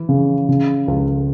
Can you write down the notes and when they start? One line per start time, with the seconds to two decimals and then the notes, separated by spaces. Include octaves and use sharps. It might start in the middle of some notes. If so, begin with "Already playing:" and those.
Already playing: E3
0.09 C#3
0.49 C#3
0.88 C#2